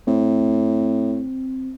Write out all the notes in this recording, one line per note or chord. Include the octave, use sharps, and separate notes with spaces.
A2 C4